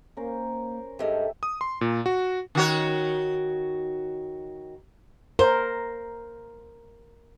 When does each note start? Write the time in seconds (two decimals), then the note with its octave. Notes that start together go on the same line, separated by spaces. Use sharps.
0.17 A#3 C#4 A#4 C5
0.99 G2 G#3 G4 A4 E5 G5
1.43 D#6
1.61 C6
1.81 A#2
2.06 F#4
2.55 D#3 F#4 C#5
5.39 A#4 C5